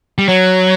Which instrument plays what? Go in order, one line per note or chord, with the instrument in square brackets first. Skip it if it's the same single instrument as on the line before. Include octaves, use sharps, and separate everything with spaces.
[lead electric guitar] G3
[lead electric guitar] F#3 [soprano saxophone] C#5